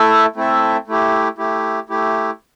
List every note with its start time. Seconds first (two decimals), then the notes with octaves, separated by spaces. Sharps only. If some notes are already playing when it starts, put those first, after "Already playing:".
Already playing: A3 E4 A4 E5
0.36 A3 C4 E4 A4 E5
0.88 A3 E4 G4
1.38 A3 E4 G4
1.89 A3 E4 G4